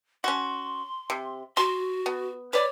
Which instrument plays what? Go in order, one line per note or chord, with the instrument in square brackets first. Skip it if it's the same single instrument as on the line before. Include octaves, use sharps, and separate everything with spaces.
[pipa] C#4 F#4 [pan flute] C6
[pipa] C3
[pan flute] F#4 [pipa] C6
[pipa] B3
[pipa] B4 D5 [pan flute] C#5